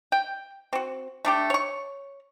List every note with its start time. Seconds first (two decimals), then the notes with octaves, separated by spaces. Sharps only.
0.12 G5
0.73 C4 F#4
1.25 A3 D4 G4
1.50 C#5 C#6